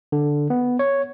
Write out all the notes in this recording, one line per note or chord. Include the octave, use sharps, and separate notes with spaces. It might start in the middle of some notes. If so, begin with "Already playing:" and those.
D3
B3
C#5